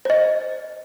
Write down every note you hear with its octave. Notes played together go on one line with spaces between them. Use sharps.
C5 D#5